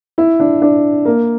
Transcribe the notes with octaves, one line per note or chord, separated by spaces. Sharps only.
E4
D4
D4
A#3